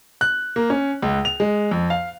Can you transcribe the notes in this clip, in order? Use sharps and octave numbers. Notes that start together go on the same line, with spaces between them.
F#6
A#3
C#4
C#2
F7
G#3
F2
F5